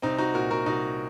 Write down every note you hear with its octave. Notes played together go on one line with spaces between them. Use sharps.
C2 C4 D#4
D#4 F#4
A#2 F#4 A#4
F#4 A#4
C2 D#4 F#4